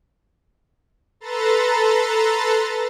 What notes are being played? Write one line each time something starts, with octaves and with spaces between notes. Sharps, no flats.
A4 B4 A#5 C6 A6